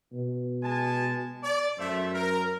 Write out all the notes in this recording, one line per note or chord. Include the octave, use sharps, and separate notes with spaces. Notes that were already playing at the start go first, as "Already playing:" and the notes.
B2
G#3 G#5 A5
D5
F#2 A3 C5 E5
A#4